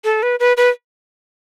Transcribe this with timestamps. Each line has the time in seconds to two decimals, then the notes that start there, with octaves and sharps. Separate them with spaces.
0.04 A4
0.23 B4
0.40 B4
0.57 B4